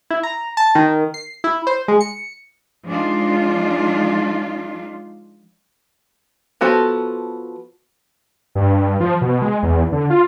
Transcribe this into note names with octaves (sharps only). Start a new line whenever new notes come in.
E4
A#5
A5
D#3
C7
E4
C5
G#3
C#7
F3 G#3 D4 D#4 F4
F3 B3 F#4 A4 C5
G2
G2
F3
B2
G#3
E2
D3
F4